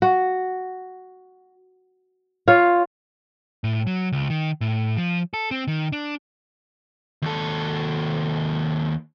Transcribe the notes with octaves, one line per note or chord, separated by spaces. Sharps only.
F#4
F4 C#5 F5
A2
F#3
C#2
D#3
A2
F3
A4
C4
D#3
D4
D#2 A4